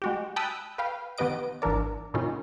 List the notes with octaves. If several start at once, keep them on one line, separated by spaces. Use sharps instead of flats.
G#3 F#4 G4
G5 A5 B5 D#6 E6 F#6
B4 F5 G5
D#3 B3 G4 B4 D#5 D7
G#1 E3 D4 A#4 D5
A2 C3 D#3 C#4 D#4 F4